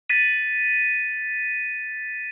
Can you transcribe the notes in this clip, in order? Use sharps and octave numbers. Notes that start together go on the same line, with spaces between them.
A6 B6 D#7